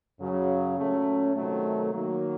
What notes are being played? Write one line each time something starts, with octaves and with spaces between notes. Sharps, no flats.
F#2 C#3 F#3
A#2 F#3 A3 C#4
C3 D#3 F#3 A3
D#3 F#3 A#3